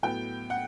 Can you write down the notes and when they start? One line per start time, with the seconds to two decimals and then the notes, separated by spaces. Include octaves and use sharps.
0.03 A2 F#3 B3 G5
0.50 F#5